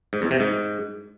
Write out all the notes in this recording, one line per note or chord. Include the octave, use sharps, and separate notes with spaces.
G#2
E2
C3
G#2